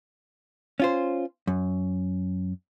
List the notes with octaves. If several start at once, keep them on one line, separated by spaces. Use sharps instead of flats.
C#4 F4 C5
F#2